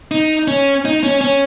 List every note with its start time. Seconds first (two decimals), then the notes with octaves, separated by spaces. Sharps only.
0.11 D#4
0.48 C#4
0.85 D#4
1.03 C#4
1.21 C#4